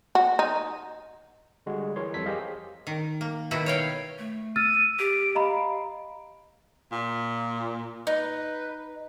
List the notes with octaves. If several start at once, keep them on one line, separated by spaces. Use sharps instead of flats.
F#4
D#4
D3 G3 G#3 F#4
E3 A#4 C#5 C6
F2 G3 A4 B6
G4 G#4 A#4 C5 D#5 F5
D#3
A#3
B2 D#3 E4 F#4
C#5 F5 G5
A3
E6 F6 A6 D#7
G4 D7
D#5 F5 A#5 B5
A#2
D#4 B4